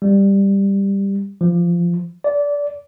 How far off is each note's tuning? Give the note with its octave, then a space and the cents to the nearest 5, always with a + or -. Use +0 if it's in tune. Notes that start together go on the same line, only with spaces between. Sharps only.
G3 +10
F3 -15
D5 -20